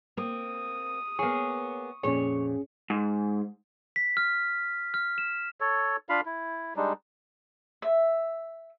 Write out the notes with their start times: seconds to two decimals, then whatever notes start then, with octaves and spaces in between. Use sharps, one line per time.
0.17 A#3 C4 D#6
1.19 A#3 B3 G#4 C#5 C#6
2.03 F2 A#2 C#4 G#4 C#5
2.90 G#2
3.96 B6
4.17 F6
4.94 F6
5.18 E7
5.61 A4 C#5
6.09 D4 F4 F5 B5
6.25 E4
6.76 G3 G#3 D4 D#4
7.82 E5